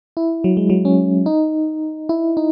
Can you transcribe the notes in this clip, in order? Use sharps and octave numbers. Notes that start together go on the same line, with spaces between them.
E4
F#3
G#3
F#3
C#4
D#4
E4
D#4